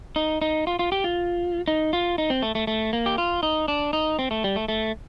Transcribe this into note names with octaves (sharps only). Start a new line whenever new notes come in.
D#4
D#4
F4
F4
G4
F4
D#4
F4
D#4
C4
A3
A3
A3
A#3
G4
F4
D#4
D4
D#4
C4
A3
G3
A3
A3